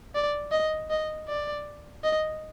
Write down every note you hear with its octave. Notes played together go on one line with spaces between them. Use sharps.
D5
D#5
D#5
D5
D#5